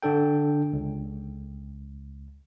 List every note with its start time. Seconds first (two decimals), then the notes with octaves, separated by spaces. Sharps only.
0.02 D3 D4 A4 G5
0.73 C#2